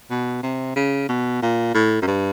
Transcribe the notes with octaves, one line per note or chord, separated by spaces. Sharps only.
B2
C3
C#3
B2
A#2
A2
F#2
G2